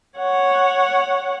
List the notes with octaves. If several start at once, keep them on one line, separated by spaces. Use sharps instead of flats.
C#5 F#5